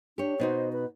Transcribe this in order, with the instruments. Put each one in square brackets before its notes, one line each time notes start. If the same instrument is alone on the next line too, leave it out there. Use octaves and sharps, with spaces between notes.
[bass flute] D4 [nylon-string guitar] G4 C#5
[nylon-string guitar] B2 D#4 F#4 [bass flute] C5
[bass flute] B4